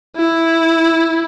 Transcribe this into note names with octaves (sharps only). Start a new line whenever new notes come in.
E4